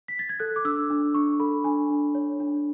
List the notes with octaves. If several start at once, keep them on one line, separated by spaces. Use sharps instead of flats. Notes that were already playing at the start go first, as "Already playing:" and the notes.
B6
A6
G#6
A4 F#6
D6
D4 E6
D4
D4 C#6
A4 B5
D4 G#5
D4
C#5
D4